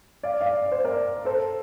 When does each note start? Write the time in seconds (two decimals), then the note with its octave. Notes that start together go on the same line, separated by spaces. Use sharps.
0.23 D5 F5
0.41 D5 F5
0.58 D5
0.72 C5
0.85 A#4 D5
1.25 A4 C5